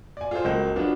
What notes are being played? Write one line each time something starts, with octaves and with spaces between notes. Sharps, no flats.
D5 G#5
F4 G#4 A4 C5
C#2 F#3 G#3 A#3 G6 E7
F#3 B3 D4 F4